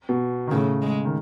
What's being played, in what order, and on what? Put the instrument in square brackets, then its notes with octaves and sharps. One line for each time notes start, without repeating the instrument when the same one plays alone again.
[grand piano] B2
D#3
[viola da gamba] A2 [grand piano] C#3
[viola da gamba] G#3
[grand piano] D#3